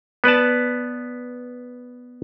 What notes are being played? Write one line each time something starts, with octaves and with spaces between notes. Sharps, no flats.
B3 B4 D5 A5